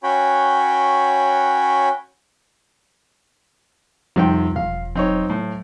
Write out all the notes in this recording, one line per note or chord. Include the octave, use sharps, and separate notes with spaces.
C#4 F#4 C#5 G5 B5
F2 C3 D#3 F3 G3 F4 G5
E1 F5
F#3 C4 D#4 C#5
A2